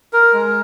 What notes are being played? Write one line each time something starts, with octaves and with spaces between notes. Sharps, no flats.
A#4
G#3